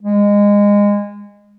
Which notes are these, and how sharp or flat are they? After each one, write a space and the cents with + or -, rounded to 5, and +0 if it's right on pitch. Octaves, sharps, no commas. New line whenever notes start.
G#3 -25